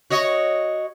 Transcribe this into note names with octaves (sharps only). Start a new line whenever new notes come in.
F#4 C#5 D#5